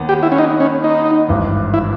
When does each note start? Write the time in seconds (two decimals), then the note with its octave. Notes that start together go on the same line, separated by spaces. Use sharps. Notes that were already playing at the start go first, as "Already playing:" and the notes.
Already playing: D#2 D#3 B3
0.09 G4
0.23 E4
0.32 C#4
0.38 D#4
0.60 C#4
0.84 D#4
1.28 G#1 G2 E3
1.74 E4